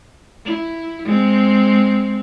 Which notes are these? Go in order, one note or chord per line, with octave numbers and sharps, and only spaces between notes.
E4
G#3 C4